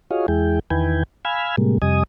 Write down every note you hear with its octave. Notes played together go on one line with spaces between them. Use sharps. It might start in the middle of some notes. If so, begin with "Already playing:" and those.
F4 F#4 G#4 C#5 D#5 F5
E2 G#3 E4 G#4 G5
E2 D#3 E4 B4 G5 G#5
F5 G#5 B5 E6 F6 G#6
A2 C3 G3 G#3 A#3
F2 C3 G3 D#5 G#5 D#6